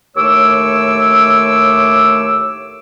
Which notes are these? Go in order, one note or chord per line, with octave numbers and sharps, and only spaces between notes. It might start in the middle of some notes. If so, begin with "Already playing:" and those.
D#2 A2 A3 C#5 D6 E6